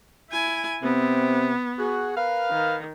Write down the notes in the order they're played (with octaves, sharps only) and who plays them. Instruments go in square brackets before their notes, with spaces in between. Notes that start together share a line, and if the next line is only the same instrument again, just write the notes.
[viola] E4 G#5
[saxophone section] C3 C4 [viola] B3
[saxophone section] F#4 G#4
A#4 B4 F5
[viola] D#3